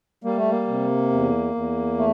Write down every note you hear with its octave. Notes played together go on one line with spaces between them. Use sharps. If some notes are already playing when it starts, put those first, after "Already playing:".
G3 A#3
A3
A#3
C3
E2
E2
A3